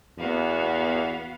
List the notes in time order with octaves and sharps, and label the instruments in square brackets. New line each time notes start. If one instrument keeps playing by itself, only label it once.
[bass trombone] E2 [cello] B3 [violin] F#4 F5